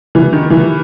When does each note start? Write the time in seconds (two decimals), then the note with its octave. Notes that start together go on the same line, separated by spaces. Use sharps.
0.15 E3
0.33 D#3
0.50 E3